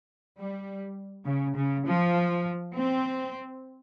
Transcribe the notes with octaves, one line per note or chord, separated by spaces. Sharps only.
G3
C#3
C#3
F3
C4